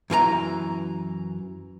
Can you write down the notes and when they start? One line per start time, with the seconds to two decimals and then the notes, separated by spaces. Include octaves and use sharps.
0.10 F#2 E3 A#4 A#5